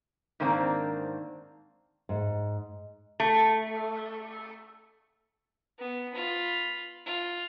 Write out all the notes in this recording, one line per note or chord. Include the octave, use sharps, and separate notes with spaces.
G#2 D#3 A#3 C4 D4
G#2
A3
B3
F4 B5
F4